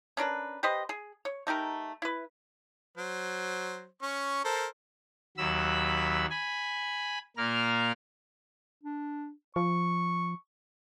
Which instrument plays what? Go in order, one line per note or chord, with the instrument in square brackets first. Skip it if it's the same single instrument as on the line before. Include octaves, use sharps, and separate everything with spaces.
[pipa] C#4 D4 A#4 B4
G4 B4 C5 D#5
G#4
C#5
A3 D#4 G4 A#4
E4 B4
[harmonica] F#3 C5
C#4 C#6
A4 A#4 C5
[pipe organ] D#2 F#3 B5 E6
G#5 B5
A#2 A#3 A#4 F6
[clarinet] D4
[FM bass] F3 [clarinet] C#6